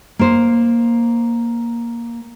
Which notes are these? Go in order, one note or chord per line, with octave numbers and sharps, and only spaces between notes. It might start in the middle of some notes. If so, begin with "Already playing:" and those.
A#3 C5